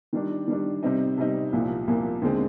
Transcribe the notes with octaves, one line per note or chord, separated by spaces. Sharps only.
D#3 G3 D4
D#3 G3 D4
C3 G3 C4 D#4
C3 G3 C4 D#4
C2 A#2 F3 A#3
C2 A#2 F3 A#3
D#2 D3 G#3 C4